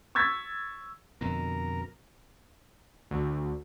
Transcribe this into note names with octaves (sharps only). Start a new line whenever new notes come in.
C#6 E6 G#6 A6 B6
F2 B2 D3 A#4
D2